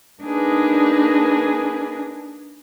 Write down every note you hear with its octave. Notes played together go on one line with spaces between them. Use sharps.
A#3 D4 D#4 G#4 B4